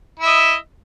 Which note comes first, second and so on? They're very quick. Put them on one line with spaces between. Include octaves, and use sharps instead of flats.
E4 E5 D#5